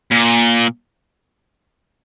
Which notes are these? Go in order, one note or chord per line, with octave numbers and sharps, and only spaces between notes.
A#2